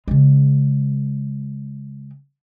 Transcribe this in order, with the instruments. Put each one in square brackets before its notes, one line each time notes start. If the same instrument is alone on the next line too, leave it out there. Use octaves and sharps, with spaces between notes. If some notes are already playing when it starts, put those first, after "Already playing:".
[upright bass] C#3 G#3